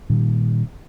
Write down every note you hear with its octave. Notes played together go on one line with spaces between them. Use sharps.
A#2 D#3 G3